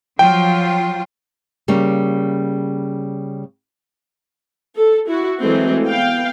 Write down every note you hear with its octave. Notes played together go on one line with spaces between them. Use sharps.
F3 F#3 F4 G5
C#3 G3 A#3
A4
E4 F#4
E3 F#3 G#3 A3 C4
B3 F5 G5